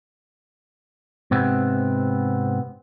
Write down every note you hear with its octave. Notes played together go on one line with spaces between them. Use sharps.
G#2 C3 B3 C4